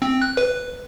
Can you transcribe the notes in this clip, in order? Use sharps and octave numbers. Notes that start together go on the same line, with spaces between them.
C4
F#6
B4